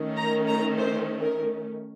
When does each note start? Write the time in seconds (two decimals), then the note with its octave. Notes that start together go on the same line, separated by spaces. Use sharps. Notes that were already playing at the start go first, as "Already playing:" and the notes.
Already playing: D#3 A3 C#4
0.17 A#5
0.47 A#5
0.77 C5
1.22 A#4